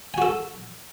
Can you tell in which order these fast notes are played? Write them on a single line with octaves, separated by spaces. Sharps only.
G#5 F#4 A4